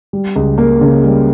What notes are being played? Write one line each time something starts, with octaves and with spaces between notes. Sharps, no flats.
G3
C#2
A#3
C#3
G3